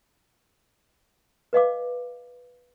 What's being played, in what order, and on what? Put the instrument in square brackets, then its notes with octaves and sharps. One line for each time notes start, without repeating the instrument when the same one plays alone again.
[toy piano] B4 D#5 F5 D6